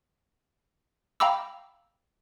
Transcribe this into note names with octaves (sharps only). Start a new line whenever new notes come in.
F5 G5 A#5 B5 D6 E6